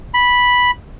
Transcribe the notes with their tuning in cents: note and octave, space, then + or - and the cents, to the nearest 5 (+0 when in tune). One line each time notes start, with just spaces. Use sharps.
B5 -5